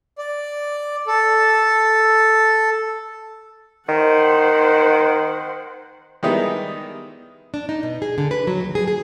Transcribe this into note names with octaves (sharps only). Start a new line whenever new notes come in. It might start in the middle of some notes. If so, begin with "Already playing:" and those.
D5
A4
D#3 C5 F#5
D#3 G3 G#3 B3 D#4 E4
D4
D#4
B2
G#4
D3
B4
F#3
D#2
G#4
G#4